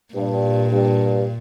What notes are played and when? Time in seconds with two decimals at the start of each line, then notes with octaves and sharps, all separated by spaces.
0.14 G2 A#2
0.72 G2